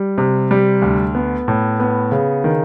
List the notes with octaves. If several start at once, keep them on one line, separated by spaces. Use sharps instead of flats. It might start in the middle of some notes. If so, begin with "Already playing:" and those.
Already playing: G3
C3
G3
D2
B3
A2
B3
C#3
D#3